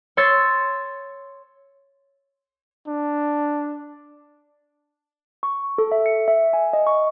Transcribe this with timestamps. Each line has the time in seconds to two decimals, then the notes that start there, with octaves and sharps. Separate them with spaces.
0.17 C#5 C6 E6 A6 C#7
2.88 D4
5.43 C#6
5.78 A4
5.92 E5
6.06 C#7
6.28 E5
6.53 G#5
6.73 D#5
6.87 C#6